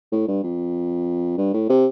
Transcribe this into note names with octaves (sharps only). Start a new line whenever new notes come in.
A2
G2
F2
G2
A2
C3